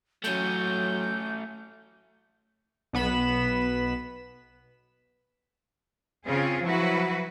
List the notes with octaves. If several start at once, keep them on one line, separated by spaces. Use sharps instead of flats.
F#3 A3 C#4 G6
B1 B3 B5 E7
C#3 C4 C#4 F4 G#4
F3 F#3 E4 F#4 B4